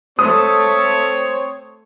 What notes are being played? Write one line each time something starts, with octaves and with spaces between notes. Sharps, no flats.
A3 C4 C#5 D#6